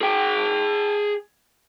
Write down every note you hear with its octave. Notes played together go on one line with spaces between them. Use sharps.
G#4 G5